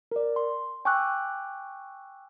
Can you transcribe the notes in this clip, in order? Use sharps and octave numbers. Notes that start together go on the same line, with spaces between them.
A#4 D5
C6
G5 G#5 C#6 D6 E6 F#6